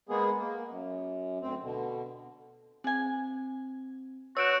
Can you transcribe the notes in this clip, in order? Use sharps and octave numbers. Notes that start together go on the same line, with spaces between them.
G#3 A#3 B3 G#4
A#3
F#2
D2 C4
B2 D3
C4 G#4 G#5
B3 F#4 C#5 E6 F#6 G6 D7 E7